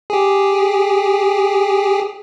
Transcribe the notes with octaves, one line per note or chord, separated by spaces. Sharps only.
G4 G#4